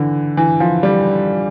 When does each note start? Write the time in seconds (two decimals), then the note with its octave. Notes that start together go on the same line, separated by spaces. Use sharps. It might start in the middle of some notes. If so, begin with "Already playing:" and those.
Already playing: D3 E3
0.37 E3
0.60 F3
0.83 G3